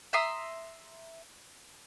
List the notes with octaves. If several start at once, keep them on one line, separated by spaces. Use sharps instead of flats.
E5 A#5 C6 D#6